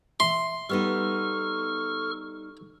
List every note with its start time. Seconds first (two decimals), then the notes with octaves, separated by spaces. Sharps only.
0.20 E5 C6
0.69 G3 B3 D#4 A4 C#6 F6